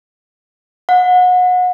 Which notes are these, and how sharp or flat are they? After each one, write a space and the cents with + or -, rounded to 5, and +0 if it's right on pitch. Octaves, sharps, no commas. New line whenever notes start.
F#5 -30